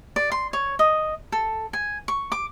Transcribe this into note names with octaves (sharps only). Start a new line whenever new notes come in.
D5
C6
C#5
D#5
A4
G#5
C#6
D6